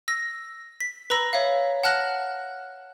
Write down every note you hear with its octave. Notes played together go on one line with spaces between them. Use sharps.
E6 A#6
B6
B4 A#5 B5 E6 A#6
C#5 E5 F5
F#5 A5 F6 F#6 A#6 F#7